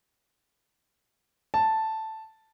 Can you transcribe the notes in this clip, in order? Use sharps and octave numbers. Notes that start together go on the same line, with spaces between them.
A5